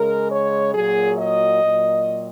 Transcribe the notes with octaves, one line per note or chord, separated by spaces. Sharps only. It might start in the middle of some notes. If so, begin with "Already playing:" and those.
Already playing: C#3 G#3 A#4
C#5
A#2 F#3 G#4
D#5
A#2 F#3